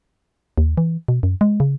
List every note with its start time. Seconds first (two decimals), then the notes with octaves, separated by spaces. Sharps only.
0.58 D#2
0.78 E3
1.08 B2
1.23 F#2
1.41 G#3
1.60 C#3